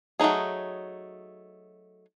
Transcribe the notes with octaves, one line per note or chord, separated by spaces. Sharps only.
F#3 A3 A#3 D#4 G#4